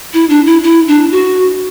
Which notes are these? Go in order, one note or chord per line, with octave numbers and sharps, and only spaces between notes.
E4
D4
E4
E4
D4
F#4